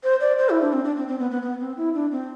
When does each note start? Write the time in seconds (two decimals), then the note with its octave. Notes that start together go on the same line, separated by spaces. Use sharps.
0.04 C5
0.21 D5
0.38 C5
0.50 E4
0.61 D4
0.73 C4
0.84 D4
0.96 C4
1.08 C4
1.19 B3
1.31 B3
1.42 B3
1.60 C4
1.77 E4
1.94 D4
2.12 C4